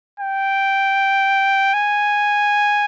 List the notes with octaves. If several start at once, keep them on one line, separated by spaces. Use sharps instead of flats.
G5
G#5